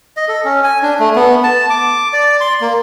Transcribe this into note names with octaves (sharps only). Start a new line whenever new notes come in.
D#5
A4
C#4
G#5
D4
A3
B3
A5
D6
D5
C6
A#3